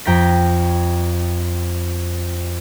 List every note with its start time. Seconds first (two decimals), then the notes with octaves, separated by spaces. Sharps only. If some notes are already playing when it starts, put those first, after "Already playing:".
0.05 F2 G5 A#5 B6